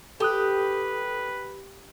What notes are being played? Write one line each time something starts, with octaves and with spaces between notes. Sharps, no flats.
G4 A4 B4 D#6 F#6